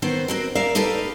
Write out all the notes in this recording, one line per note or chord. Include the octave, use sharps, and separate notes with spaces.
D#3 B3 C4 C5
C4 F#4 A#4
A#4 D5 E5 F5
D#4 G4 A4 B4 F5